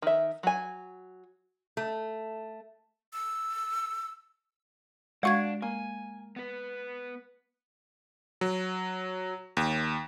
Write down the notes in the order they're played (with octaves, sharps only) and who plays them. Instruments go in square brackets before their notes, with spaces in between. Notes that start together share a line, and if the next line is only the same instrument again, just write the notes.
[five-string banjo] D#3 E5
F#3 G#5
[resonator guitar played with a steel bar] A3
[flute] E6
[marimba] G#3 C#6 G#6 [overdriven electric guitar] D4 [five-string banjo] F#4 F5 F#5
[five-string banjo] A#3 [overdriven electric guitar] G#5
[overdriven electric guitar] B3 B4
[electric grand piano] F#3
D#2